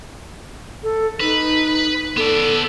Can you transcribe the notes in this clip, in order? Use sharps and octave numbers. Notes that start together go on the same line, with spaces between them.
A4
D#4 B4
B3 A4 D5